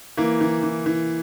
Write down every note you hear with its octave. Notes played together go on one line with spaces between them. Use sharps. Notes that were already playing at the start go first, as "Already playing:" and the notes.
E3 A#3
E3
E3
E3